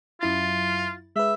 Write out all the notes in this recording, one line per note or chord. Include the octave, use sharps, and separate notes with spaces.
F#2 E4 F4 A6
G#3 B4 E5